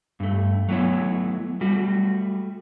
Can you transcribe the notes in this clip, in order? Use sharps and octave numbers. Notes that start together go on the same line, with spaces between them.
G2 A3
F#3 A3 B3 E4 C#5
G3 A3 F#4